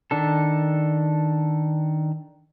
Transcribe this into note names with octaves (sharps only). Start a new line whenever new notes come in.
D#3 D4 A4